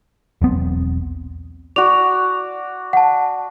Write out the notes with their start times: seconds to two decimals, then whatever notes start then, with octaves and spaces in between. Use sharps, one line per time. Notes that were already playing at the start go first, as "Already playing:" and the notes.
0.42 E1 B1 B3 C4
1.76 F#4 D5 F7
2.93 F#5 A5